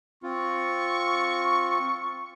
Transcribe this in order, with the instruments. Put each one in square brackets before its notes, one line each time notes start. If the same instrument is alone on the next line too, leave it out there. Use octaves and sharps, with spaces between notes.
[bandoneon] C4 F4 [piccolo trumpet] C#6